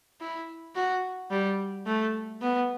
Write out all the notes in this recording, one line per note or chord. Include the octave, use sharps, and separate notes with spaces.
E4
F#4
G3
A3
B3